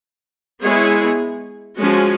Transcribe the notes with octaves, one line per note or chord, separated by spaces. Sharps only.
G#3 B3 E4 G#4 C#5
F3 G#3 C#4 F#4